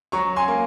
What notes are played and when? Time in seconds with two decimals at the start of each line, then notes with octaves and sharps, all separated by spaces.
0.12 F#3 A#5 C#6
0.36 G#5 C6
0.48 A#3